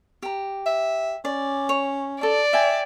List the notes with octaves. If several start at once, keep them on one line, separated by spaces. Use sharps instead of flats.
G4 A#5
E5
C#4 D5
C#5
A4 D5 A5
E5 G5 G#5